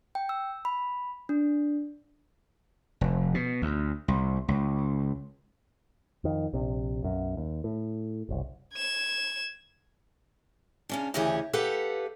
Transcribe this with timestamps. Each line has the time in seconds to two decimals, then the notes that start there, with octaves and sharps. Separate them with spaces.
0.15 G5
0.29 E6
0.65 B5
1.29 D4
3.01 F1
3.34 B2
3.62 D2
4.08 C2
4.48 C#2
6.24 F2 D#3
6.53 A#1 C3
7.03 B1 F#2
7.37 D#2
7.64 A2
8.29 F#1 C2
8.74 G#6 E7
10.89 C#3 C#4 D4
11.14 D2 C#3 E3 G4 G#4 C#5
11.53 G4 A4 B4 F5 F#5